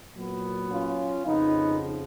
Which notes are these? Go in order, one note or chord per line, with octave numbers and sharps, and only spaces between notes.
A#2 F#3 B3
C#4 F4
F2 C#3 F3 B3 D#4